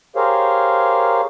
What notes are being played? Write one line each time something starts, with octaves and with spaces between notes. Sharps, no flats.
G4 G#4 A#4 C5 C#5 F5